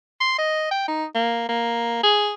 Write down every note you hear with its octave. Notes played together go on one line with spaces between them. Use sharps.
C6
D#5
G5
D#4
A#3
A#3
G#4